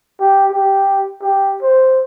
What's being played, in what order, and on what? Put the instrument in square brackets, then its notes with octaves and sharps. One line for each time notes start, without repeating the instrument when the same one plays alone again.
[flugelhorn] G4
G4
G4
C5